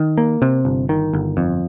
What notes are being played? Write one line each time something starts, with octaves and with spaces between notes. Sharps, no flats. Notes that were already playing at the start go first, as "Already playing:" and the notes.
Already playing: D#3
A#3
C3
G1
D#3
G1
F2